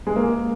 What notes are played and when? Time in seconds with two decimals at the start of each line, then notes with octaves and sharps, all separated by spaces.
0.07 G#3
0.16 A#3